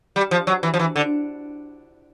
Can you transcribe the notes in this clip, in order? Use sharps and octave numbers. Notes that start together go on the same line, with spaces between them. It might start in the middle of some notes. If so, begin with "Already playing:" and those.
G3
F3
F#3
E3
F3
E3
D3